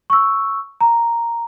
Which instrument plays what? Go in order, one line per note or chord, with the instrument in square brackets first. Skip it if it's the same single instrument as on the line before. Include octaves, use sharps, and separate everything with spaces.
[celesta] C#6 E6
A#5